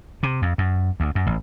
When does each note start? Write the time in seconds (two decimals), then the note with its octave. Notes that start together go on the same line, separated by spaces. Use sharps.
0.23 C3
0.42 F2
0.58 F#2
1.00 D2
1.15 F#2
1.27 A1